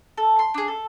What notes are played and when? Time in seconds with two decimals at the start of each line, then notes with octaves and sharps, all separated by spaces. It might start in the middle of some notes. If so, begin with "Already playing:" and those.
0.18 A4
0.39 C6
0.54 D4 G#4
0.68 A4